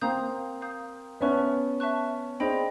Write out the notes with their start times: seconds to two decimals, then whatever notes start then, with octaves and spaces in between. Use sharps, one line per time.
0.01 A#3 C4 F5 A#5 D#6 G6
0.62 F5 A#5 D#6 G6
1.21 B3 C#4 E5 A5 C#6 F#6
1.80 E5 A5 C#6 F#6
2.40 C4 D4 G#4 C5 D#5 G5 B5